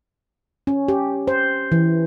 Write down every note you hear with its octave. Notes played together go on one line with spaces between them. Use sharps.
C#4
G4
C5
E3